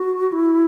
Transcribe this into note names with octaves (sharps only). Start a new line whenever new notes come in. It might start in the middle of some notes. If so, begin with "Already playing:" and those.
Already playing: F#4
E4